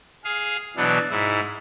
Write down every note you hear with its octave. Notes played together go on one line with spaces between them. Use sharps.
G#4 F5
B2 E3 F#3 D4
G#2 E4